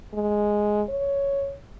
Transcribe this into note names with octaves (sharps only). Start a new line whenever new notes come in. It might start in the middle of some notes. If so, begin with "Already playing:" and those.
G#3
C#5